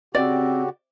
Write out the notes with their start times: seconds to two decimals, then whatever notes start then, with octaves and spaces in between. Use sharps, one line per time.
0.15 C#3 C4 F#4 G4 D5